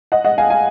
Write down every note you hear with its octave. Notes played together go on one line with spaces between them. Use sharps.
D#5 F#5
D#5 F#5
F5 G#5
F5 G#5